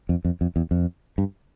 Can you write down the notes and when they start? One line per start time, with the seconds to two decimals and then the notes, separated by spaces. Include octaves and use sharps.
0.09 F2
0.25 F2
0.41 F2
0.56 E2
0.71 F2
1.18 G2